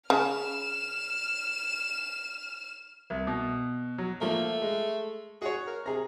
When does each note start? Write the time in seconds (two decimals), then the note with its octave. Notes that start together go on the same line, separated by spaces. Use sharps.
0.10 C#3 F6 E7
3.10 C2
3.27 B2
3.98 F#3
4.21 F3 A3 A#3
4.62 G#3
5.42 F#4 G#4 C#5
5.67 A#4
5.86 C3 G#4 A#5